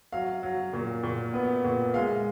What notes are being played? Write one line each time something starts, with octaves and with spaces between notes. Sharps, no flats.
F#3 F5
F#3
A#2
A#2
B3
A#2
G#3 F5